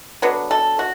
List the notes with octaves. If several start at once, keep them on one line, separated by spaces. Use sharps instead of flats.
D3 F#3 B3
A4
F#4